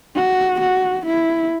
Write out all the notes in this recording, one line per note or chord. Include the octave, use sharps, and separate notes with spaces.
F#4
F#4
E4